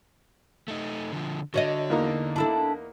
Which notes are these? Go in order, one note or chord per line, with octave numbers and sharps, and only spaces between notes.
A3 D#4
D3 F3
D3 F#4 C#5 D#5
E2 A#3 D#4
D4 E4 A4